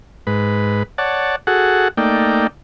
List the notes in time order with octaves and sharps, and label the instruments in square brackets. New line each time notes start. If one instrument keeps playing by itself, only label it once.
[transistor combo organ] G#2 B4
C#5 D5 F#5 A5
F#4 G#4 A4 F#5
A3 A#3 D#4 D5 G5